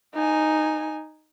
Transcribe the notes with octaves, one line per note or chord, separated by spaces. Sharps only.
D#4 G#5